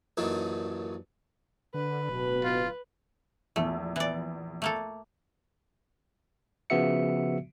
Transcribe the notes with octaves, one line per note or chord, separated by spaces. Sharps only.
A1 F#2 A#2 D#3
D3 B4
D1 B2
F4
A#1 E2 A3 E6
E3 D5
A3 A#3 A4
C#3 F3 B3 F#4 E5 C#7